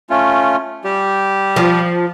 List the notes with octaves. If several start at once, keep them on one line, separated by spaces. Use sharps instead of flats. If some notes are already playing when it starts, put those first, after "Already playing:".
A3 C#4 F4
G3 G4
F3